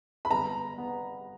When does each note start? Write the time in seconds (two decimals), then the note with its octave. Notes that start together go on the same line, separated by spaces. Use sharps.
0.25 B5
0.31 G1 A#5
0.78 B3